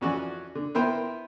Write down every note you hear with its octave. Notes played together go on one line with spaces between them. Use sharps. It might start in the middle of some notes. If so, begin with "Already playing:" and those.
F2 E3 C#4 F#4 D5
D3
B3 E4 A#4 C5 G5